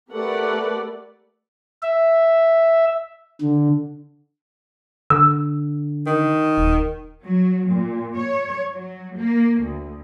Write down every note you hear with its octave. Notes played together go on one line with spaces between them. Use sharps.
A3 G4 A#4 B4 D5 F#5
E5
D3
D3 E6
D#3
D#1
F#3
A#2
C#5
F#3
A#3
D2